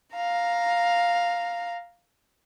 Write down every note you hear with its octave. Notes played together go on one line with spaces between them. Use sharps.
F5 A#5